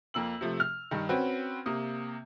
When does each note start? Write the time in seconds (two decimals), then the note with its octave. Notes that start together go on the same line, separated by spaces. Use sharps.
0.14 F2 A#3 E6 F#7
0.41 C3 F3 A3
0.60 F6
0.91 G2 D#3
1.09 C4 C#4 F#4 B4
1.66 C3 A#3 D#6